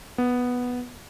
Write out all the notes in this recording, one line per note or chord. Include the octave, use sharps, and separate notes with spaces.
B3